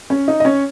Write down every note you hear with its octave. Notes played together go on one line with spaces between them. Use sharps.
C#4 C#5
D#4 D#5
D#5
C#4 C#5